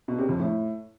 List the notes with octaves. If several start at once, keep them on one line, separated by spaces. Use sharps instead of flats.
B2
C3
F2
A2